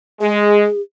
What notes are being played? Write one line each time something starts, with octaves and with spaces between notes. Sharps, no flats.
G#3 G#4